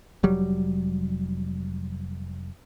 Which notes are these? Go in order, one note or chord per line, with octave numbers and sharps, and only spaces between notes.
F1 F#3 G3